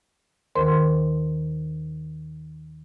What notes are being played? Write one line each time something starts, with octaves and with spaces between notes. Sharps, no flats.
D#2 D#3 A#4 C5 C6